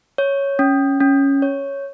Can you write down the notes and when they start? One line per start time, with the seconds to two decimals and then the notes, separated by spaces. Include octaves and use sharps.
0.18 C#5
0.59 C#4
1.00 C#4
1.42 C#5